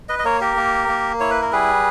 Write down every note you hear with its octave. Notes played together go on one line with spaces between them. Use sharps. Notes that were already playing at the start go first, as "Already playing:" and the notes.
B4 D#5
D#5
A#3 A#4 C#5
G4 A#4
A#3
A#3
E4 C#5
B4
A#4
G3 G#4 B4